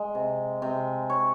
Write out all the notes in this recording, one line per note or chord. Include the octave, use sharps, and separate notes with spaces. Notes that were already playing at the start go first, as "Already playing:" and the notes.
Already playing: G#3
C3
C3
C#5